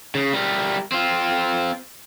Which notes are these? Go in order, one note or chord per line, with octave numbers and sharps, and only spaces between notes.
C#3
G3 A#4
C4 F4